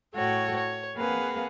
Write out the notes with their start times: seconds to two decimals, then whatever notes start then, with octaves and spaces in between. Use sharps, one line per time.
0.14 A2 F#4 A4 C#5 G5
0.56 C#5
0.95 A#3 C4 G#4 B4 F5 F#5